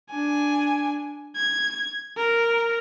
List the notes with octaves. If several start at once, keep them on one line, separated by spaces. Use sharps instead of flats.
D4 G#5
G#6
A#4